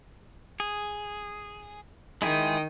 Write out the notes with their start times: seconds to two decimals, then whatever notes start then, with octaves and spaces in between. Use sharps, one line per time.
0.60 G#4
2.22 D#3 G#3 E4 G#4 G5 D#6